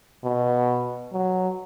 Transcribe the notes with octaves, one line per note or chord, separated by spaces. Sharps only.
B2
F#3